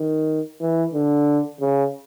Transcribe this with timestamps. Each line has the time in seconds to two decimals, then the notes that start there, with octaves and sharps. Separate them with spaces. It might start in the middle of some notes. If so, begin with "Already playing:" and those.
Already playing: D#3
0.61 E3
0.93 D3
1.61 C#3